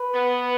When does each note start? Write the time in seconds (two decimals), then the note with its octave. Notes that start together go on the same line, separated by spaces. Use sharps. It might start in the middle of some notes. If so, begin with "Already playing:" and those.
Already playing: B4
0.14 B3